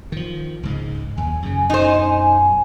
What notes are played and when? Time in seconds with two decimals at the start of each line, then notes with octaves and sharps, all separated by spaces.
0.12 D#3 F3
0.63 C#2 G#2 G#3
1.17 D#2 G#5
1.43 F#2 C#3
1.70 F#2 B2 D#4 C5